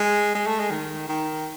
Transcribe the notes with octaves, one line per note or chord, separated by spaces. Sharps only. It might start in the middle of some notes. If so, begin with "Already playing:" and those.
Already playing: G#3
G#3
A3
G#3
D#3
D#3